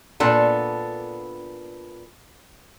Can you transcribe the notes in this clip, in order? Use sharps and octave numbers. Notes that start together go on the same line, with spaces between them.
A#2 B3 D4 A4